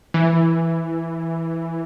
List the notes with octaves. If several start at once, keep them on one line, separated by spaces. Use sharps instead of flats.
E3